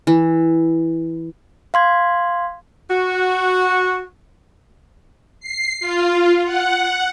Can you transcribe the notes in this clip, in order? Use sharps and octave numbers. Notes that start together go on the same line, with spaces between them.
E3
F5 C6 G#6
F#4
C7
F4
F#5